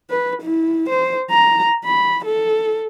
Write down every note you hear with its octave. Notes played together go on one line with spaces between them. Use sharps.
B4
E4
C5
A#5
B5
A4